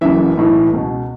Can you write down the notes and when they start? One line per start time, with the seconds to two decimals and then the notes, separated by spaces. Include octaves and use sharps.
0.01 F#1 F#2 C#3 E3 E5
0.37 B1 A2 E3
0.73 C#2 B2